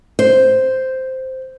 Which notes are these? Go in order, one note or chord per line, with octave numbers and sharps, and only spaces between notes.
C5